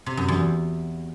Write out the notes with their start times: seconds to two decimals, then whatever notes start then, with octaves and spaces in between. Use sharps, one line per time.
0.06 C3
0.17 F#2
0.28 E2